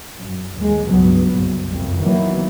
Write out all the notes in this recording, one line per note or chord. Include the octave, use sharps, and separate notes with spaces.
F#2
D#2 G#3
C#2 G2 F#3 B3
F#1 C2
C2 F2
D#3 E3 F#3 A#3 B3